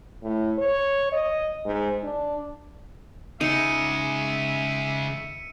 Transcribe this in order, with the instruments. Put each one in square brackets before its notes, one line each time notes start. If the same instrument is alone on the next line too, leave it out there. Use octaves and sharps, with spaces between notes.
[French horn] A2
C#5
D#5
G#2
D4
[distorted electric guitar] C#3 G#3 [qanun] D#4 [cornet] E5 [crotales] C#7 D#7